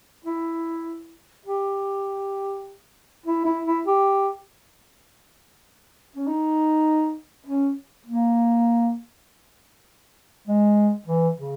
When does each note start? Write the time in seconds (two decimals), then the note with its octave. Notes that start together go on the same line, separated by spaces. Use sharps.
0.25 E4
1.46 G4
3.26 E4
3.45 E4
3.66 E4
3.86 G4
6.16 C#4
6.27 D#4
7.47 C#4
8.07 A#3
10.47 G#3
11.07 E3
11.37 C#3